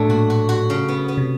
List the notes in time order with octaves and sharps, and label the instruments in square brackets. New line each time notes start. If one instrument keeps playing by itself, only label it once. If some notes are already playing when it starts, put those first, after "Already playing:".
Already playing: [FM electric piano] A2 [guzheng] F#3 A3 D4
[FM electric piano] A#2 [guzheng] F#4
[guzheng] F#4
F#4
C#3
B3
B3
[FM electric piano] C3